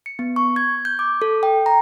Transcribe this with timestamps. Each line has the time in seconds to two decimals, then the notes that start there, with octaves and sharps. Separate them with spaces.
0.06 C#7
0.19 B3
0.36 C#6
0.56 G#6
0.85 G6
0.99 D6
1.22 A4
1.43 G5
1.66 A#5